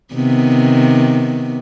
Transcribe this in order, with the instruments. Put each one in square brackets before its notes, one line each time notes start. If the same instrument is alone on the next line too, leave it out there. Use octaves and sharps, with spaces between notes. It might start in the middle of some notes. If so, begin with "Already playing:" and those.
[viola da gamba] C3 D#3 B3